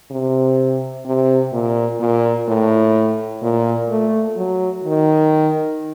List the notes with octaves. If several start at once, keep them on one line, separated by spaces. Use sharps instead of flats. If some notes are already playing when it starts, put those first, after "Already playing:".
C3
C3
A#2
A#2
A2
A#2
A3
F#3
D#3